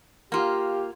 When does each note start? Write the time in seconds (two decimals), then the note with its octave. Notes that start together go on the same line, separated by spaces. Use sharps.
0.32 A#3 F4 G4